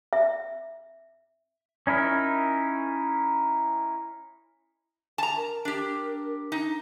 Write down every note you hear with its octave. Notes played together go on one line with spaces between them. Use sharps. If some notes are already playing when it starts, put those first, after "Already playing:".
E5
C#4 D#4 E4 A#4
A5 A#5
A#4
D4 G4
D#4